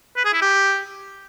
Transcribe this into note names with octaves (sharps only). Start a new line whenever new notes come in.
B4
G#4
E4
G4